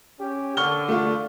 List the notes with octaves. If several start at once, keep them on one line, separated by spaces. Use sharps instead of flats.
C#4 G4
D3 C#6 F6 G7
A3 F4